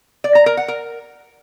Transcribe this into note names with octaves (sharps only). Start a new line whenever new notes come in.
D5
A#5
A#4
F#5
A#4